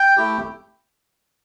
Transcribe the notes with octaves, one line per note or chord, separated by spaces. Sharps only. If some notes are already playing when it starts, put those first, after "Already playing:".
Already playing: G5
A3 E4 G4